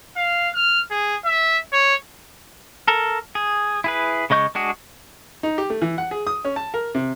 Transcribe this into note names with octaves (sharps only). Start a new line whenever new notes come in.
F5
F6
G#4
E5
C#5
A4 A#4
G#4
E4 G#4 B4
C#3 G#3 D#5 C#6 G6
G#3 D4 F#4 G#4
D#4
G4
A3
E3
F#5
G#4
D#6
C#4
A5
A#4
C3